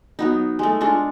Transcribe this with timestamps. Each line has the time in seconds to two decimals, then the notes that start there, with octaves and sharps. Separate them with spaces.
0.19 F#3 B3 D#4
0.59 G#3 A3
0.81 G#3 D4 F4 C#6